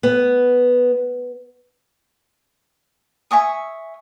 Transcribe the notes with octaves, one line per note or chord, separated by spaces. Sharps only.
B3
E5 G#5 C#6 D#6